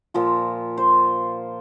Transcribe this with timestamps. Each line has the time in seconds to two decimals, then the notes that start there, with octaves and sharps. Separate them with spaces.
0.14 A#2 F3 F4
0.77 C5